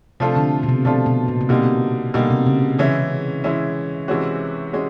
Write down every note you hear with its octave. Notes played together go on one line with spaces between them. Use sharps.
C3 F3 A3 D4 F4 A4
D3
B2
C3
B2 F3 A3 D4 F4 A4
B2
A#2
C3
B2 D3 G3 A#3 D#4
B2 D3 G3 A#3 D#4
C3
C#3
C#3 E3 G#3 C#4 E4
E3 G#3 C#4 E4
C3 E3 G#3 C#4 F#4
G#3 C#4 F#4